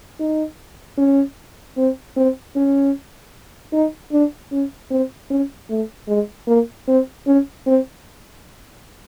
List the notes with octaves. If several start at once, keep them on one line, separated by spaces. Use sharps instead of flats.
D#4
C#4
C4
C4
C#4
D#4
D4
C#4
C4
C#4
A3
G#3
A#3
C4
C#4
C4